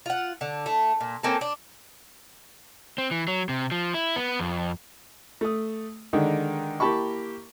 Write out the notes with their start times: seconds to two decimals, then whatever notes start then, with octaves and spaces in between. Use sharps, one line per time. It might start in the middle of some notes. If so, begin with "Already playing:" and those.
0.06 F4 F#5
0.41 D3
0.66 A3
1.00 A#2
1.23 A#3 C4 C#4 A4
1.41 D4
2.98 C4
3.11 E3
3.28 F#3
3.49 C3
3.71 F3
3.94 E4
4.16 B3
4.40 F2
5.41 A3 D#6
6.13 D3 D#3 G#3 D#4
6.80 A#3 E4 G4 A5 B5 C#6